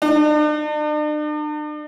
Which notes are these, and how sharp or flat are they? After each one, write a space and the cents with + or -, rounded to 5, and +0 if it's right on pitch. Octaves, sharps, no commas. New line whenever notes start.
D4 +45